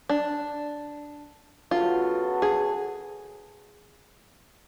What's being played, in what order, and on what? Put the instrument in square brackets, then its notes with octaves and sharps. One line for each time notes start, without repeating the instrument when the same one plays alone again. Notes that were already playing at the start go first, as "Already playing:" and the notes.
[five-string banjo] D4
[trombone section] C#3 F#3 B3 F#4 A4 [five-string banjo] F4
[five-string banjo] G#4